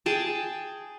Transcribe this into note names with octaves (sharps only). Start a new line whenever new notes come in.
G#4 G5 A5